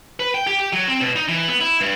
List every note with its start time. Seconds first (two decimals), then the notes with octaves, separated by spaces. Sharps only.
0.20 B4
0.34 G5
0.47 G4
0.60 G4
0.73 F#3
0.88 C4
1.01 B2
1.16 D#4
1.28 E3
1.48 B3
1.61 E4
1.81 G2